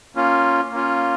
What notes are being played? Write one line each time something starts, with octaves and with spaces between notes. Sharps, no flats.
A#3 C#4 F4
A#3 C#4 F4